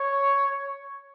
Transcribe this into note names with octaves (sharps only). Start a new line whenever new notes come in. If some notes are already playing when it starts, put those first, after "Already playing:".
Already playing: C#5